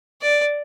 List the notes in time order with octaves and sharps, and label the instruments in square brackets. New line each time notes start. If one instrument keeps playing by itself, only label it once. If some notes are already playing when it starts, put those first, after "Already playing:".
[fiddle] D5